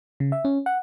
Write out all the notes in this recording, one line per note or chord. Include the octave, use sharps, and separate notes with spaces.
C#3
E5
C#4
F#5